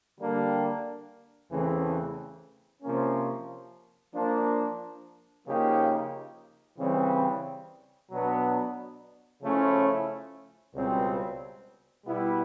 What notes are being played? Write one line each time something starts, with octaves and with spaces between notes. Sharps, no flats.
D3 G3 A#3 D4 G4
E2 C#3 E3 A3 C4
C3 F3 A#3 C#4
F3 A#3 D4
C#3 F3 A#3 D#4 G4
C#3 E3 G3 C4
B2 F#3 B3 D4
C#3 F3 A3 C#4 E4
C#2 B2 G3 C4
B2 G3 B3 E4